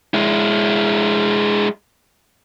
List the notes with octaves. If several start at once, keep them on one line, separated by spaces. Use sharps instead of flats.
G#3 E4